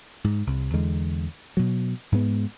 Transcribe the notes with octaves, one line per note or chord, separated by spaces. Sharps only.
G#2
C2
E2 D3 G#3
B2 F#3
G#2 G#3 A#3 B3